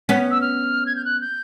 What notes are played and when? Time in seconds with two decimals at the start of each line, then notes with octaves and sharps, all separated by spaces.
0.09 B3 C#4 B6
0.31 E6
0.41 F6
0.86 G#6
0.96 G6
1.05 F#6
1.21 G6